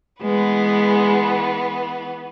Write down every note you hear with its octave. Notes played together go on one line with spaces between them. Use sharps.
E3 G#3 B3 B4